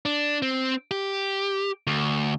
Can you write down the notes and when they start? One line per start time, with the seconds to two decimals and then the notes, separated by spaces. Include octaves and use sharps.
0.05 D4
0.42 C4
0.91 G4
1.87 D2